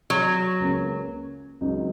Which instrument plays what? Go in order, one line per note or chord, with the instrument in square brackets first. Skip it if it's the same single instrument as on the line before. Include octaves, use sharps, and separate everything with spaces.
[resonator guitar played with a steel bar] F#3
[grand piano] C#2 C#3 A#3 C#4
C#2 C#3 F#3 D#4